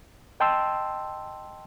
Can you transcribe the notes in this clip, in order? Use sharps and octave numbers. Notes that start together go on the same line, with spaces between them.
D#5 G5 A5 C6 E6